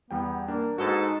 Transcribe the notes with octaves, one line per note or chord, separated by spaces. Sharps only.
E2 G3 B3 G5
A#3 D4 A#4
G#2 G#3 D#4 F#4 A4 B4 D#6